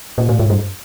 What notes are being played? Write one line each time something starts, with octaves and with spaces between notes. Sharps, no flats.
A#2
A2
G#2
G2